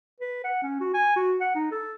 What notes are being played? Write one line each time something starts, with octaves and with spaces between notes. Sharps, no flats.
B4
F#5
C#4
F#4
G#5
F#4
F#5
D#4
A4